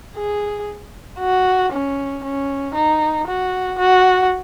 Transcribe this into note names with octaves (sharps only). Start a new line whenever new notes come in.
G#4
F#4
C#4
C#4
D#4
F#4
F#4